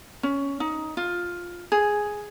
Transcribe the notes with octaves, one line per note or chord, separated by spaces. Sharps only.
C#4
D#4
F4
G#4